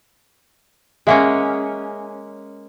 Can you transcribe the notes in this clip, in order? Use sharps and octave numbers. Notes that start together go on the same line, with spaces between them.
G#3 A#3 C#4 G#4 E5 F#5